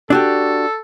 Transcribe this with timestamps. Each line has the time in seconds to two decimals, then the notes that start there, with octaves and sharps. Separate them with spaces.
0.10 D4 F#4 G4 A4